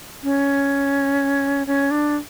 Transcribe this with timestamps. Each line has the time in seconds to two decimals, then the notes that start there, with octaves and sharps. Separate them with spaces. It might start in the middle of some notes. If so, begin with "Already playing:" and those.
0.23 C#4
1.67 C#4
1.91 D4